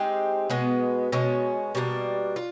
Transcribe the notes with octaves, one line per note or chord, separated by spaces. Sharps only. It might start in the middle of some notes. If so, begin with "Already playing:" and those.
Already playing: G#3 C4 D#4 G4
B2 G#3 B3
B2 G#3 C#4
B2 G3 A#3 D4
F4